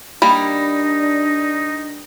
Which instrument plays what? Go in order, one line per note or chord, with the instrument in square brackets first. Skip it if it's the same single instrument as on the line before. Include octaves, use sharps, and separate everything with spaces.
[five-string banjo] G3 A#3 [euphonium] D4 [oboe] D#4 [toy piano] B5